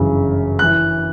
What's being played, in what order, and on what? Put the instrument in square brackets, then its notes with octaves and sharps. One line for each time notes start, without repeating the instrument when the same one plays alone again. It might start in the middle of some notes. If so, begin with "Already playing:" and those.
Already playing: [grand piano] G1 F#2 C#3 E3
E3 F#6